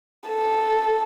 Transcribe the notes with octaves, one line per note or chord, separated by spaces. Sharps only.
A4